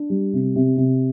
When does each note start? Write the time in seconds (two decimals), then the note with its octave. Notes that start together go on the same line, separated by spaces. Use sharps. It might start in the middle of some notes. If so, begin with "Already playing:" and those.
Already playing: D4
0.10 G3
0.33 C3
0.56 C3
0.77 C3